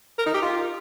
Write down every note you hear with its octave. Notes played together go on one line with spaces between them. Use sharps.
A#4
D#4
G4
F4